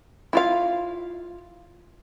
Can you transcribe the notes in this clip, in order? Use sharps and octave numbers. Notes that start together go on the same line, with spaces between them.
E4 F4 F5